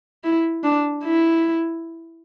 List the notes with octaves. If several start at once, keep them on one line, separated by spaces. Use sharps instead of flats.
E4
D4
E4